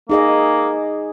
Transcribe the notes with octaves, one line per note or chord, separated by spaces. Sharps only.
A#3 D#4 G#4 D#5